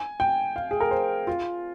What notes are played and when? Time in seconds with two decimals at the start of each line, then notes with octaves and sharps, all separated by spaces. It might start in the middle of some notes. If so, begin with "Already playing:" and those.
Already playing: G#5
0.20 G5
0.56 F5
0.71 G#4
0.80 A#4
0.91 C5
1.27 F4